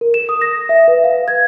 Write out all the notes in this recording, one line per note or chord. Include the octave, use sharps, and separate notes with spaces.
A#4
E7
D#6
A#6
E5
B4
F5
G#6